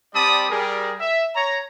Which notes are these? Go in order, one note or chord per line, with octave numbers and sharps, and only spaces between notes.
G3 C4 D5 A5 B5 D#6
G3 G#4 A#4
E5
C#5 A#5